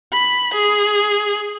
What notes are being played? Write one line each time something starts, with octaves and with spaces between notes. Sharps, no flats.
B5
G#4